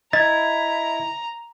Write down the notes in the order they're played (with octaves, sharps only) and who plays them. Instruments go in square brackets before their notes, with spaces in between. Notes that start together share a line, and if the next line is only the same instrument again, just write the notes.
[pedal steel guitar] E4 [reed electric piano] D#5 G#6 [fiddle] A#5 [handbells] A6